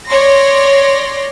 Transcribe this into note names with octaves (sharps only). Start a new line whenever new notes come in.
C#5 D5 C6 A#6